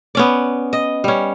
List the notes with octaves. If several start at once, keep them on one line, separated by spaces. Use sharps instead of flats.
B3 C#4 D5
D#5
G3 C#4